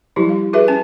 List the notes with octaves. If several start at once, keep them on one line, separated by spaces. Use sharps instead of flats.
F3 G3 E4 G4
F5
F#4 G#4 B4 E5
C#4 G#5 A5